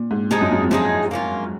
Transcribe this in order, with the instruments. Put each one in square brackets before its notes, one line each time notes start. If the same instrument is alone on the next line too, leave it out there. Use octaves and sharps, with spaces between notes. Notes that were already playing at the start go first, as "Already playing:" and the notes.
Already playing: [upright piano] A#2
G#2
[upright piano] G#2 [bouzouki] F3 G#3 D#4 G#4
[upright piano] F#2
F#2
F2
[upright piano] F#2 [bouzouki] F3 G#3 D#4 G#4
[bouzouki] A#3 C#4 F4